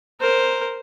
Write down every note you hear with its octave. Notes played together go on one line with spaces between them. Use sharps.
A#4 C5